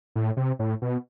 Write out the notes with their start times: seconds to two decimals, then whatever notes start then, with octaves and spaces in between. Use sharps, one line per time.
0.16 A2
0.37 C3
0.59 A2
0.82 B2